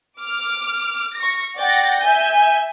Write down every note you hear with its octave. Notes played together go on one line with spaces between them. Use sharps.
D6 F6
C#6 A#6
D5 F#5 G5 A6 A#6
E5 G#5 G6